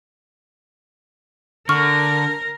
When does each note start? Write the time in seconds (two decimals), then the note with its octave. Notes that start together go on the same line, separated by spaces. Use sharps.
1.69 D3 A#4 C#6 F6